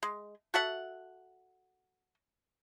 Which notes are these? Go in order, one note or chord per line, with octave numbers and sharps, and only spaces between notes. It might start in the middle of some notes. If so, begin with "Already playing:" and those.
G#3
F#4 A4 E5 F#5